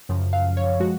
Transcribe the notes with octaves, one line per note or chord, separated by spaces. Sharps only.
F#2 C#3 F3
F5
C#5
F3 G#3 F#4